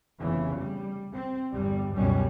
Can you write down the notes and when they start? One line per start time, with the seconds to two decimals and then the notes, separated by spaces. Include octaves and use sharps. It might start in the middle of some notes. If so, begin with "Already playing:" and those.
0.20 F1 E2 C#3 E3
0.59 G3
1.14 C4
1.52 G1 E2 G2 G3
1.94 C#2 F#2 B2 G3 C#4